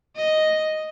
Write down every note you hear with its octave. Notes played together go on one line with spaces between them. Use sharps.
D#5